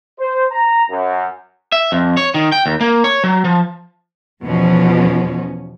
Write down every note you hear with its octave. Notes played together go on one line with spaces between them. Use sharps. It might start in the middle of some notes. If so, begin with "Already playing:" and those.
C5
A#5
F#2
E5
F2
C#5
D#3
G5
D#2
A#3
C#5
F#3
F3
E2 B2 F3 C#4